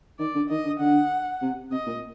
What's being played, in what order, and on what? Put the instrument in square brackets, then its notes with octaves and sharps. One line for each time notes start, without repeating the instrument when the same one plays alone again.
[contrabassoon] D#3 [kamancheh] D5
[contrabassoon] D3
[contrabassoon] D#3 [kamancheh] D#5
[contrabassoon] D3
[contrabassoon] D3 [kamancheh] F#5
[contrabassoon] C3
[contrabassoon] C3 [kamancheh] D#5
[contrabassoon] A#2